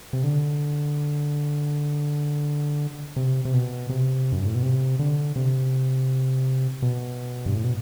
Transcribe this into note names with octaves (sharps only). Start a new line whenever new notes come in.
C3
D3
C3
C3
B2
C3
F#2
G2
A2
B2
C3
D3
C3
B2
G2
A2
B2